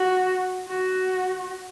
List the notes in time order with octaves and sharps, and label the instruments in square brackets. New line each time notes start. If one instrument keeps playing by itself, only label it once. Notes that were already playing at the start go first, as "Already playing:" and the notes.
Already playing: [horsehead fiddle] F#4
F#4